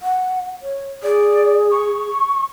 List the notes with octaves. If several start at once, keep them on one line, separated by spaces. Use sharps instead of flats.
F#5
C#5
G#4 D5
C#6